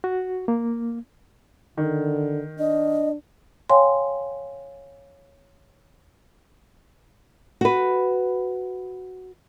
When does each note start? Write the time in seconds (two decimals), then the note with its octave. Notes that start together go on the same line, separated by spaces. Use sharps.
0.04 F#4
0.48 A#3
1.77 D3 D#3
2.59 D4 D#5
3.70 C#5 F5 G5 G#5 C6
7.61 F#4 B4